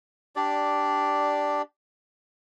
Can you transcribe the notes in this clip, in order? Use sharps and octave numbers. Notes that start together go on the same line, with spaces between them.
D4 G4 D5